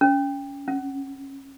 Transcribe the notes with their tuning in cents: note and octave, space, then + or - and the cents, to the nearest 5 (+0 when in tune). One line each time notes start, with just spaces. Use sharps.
C#4 +25
C#4 -25